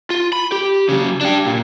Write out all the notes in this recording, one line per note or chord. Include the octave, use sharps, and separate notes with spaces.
F4
B5
G4
C#3 F#3
D4 G4
A#2